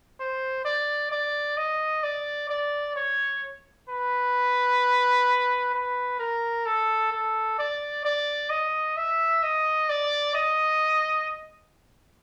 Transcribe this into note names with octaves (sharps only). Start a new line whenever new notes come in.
C5
D5
D5
D#5
D5
D5
C#5
B4
B4
A#4
A4
A4
D5
D5
D#5
E5
D#5
D5
D#5